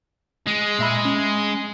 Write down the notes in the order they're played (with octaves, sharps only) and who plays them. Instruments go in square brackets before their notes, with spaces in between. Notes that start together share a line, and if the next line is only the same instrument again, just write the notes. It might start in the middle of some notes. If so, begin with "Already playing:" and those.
[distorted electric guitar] G#3
[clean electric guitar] A#2 E5 B5
C#4